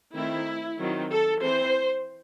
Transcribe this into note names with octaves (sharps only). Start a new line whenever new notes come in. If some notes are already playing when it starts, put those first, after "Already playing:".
D#3 A3 C4 E4
D#3 F#3 C4
A4
E3 C4 C5